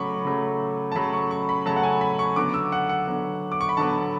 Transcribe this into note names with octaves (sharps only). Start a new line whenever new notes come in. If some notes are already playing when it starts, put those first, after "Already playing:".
Already playing: C#3 F#3 A3 B5 C#6 D6
C#3 F#3 A3
A5
C#3 F#3 A3 B5
C#6
C#6
B5
C#3 F#3 A3 A5
F#5
G#5
B5
C#6
D3 F#3 B3 D6
E6
F#5
F#5
D3 F#3 B3
D6
C#6
B5
D3 F#3 B3 A5